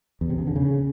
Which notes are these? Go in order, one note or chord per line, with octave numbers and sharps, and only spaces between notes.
E2
C3
C#3
D3
C#3